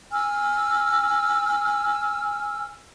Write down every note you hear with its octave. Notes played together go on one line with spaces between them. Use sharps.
G#5 E6 F6